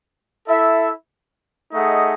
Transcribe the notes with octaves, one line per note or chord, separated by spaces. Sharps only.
E4 A4 E5
A3 D#4 G#4 D#5 F#5